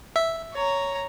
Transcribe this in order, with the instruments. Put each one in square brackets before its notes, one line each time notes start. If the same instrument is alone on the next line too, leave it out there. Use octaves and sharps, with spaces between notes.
[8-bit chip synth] E5
[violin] C#5 A#5